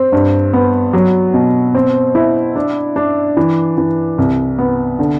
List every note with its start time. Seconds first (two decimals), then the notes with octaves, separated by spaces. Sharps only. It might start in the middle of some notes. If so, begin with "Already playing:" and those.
Already playing: C4
0.12 G2
0.53 B3
0.93 F#3
1.34 B2
1.75 C4
2.15 E4
2.56 D4
2.96 D4
3.37 E3
3.78 E3
4.18 C2
4.59 B3
4.99 D3